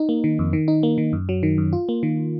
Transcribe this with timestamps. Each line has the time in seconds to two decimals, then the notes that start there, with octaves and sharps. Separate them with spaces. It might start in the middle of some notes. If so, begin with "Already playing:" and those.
Already playing: D#4
0.09 A#3
0.24 D#3
0.39 F2
0.53 D#3
0.68 D#4
0.83 A#3
0.98 D#3
1.13 F#2
1.29 F#3
1.43 D#3
1.58 F#2
1.73 F4
1.89 A#3
2.03 D#3